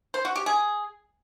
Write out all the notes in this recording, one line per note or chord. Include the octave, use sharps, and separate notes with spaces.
C5
F#4
G4
G#4